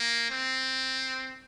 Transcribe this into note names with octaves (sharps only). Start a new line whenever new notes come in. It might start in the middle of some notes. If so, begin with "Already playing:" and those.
Already playing: A#3
C4